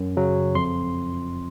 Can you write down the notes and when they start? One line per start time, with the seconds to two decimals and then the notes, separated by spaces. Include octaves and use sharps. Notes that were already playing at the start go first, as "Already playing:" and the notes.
Already playing: F#2
0.17 C#3 F#3
0.55 F2 C6